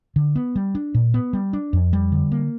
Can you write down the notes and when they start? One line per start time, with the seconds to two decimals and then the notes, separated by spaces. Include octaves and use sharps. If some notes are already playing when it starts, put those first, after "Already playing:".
0.16 D3
0.36 B3
0.56 G3
0.75 D4
0.94 A#2
1.14 B3
1.33 G3
1.53 D4
1.73 F2
1.93 G3
2.12 D3
2.32 A#3